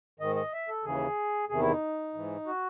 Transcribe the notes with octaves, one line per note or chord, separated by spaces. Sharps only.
G#2 D#3 D#5
D#5
E5
A4
D#2 C#3 E3 G#4
E2 C3 D#3 G#4
E4
D#4
G#2 E3
F#4